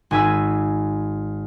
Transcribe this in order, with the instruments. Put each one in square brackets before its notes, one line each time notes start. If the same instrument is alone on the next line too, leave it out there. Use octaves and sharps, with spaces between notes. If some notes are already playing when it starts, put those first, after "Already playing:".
[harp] G#1 G#5 B5 E6